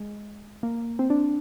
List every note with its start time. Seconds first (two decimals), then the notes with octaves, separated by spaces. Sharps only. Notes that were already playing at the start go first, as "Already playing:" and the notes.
Already playing: G#3
0.63 A#3
0.99 C4
1.10 D4